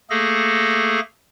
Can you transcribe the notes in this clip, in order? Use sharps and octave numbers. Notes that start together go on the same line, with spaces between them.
A3 A#3 G#4 A4 A#6